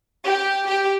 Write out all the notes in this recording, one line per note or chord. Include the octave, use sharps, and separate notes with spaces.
G4
G4